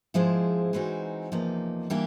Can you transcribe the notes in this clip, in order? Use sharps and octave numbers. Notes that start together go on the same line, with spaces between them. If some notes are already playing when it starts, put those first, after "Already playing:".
G#2 F3 G#3 C4 E4
E3 G#3 C4 D#4 F#4
E2 C3 F3 A#3 D#4
E3 G3 A#3 D4 G4